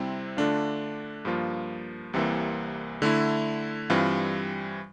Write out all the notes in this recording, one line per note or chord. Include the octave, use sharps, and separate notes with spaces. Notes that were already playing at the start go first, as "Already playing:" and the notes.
Already playing: C3 G3 C4 E4
D3 A3 D4 F4
G2 F3 A#3 F4
C2 C3 E3 A#3
D3 A3 E4
G2 E3 G3 C4 F4